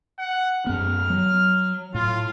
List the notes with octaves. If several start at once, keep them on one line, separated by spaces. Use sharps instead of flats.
F#5
F#2 B3 F6
F#3
A2 F4